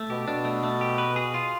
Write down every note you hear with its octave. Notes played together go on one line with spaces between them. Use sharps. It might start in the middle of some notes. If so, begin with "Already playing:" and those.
Already playing: A3
B2 G4
B2 D4
A3
A3
G4
B4
G#4
F4